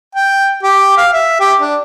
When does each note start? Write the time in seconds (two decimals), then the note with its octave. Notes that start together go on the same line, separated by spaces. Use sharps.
0.15 G5
0.63 G4
0.98 F5
1.13 E5
1.40 G4
1.60 D4